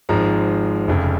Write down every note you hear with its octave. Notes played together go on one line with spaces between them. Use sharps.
G#1 G#2 F3 G#3 A#5
F1 F2 C#3